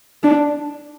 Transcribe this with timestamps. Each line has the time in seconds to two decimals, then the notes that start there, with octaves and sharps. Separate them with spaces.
0.23 D4